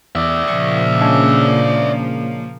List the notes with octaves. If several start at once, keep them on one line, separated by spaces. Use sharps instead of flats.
E2 D5 E5
A#2 C#3 F3 A#3 C#6
G#3 C#4 D4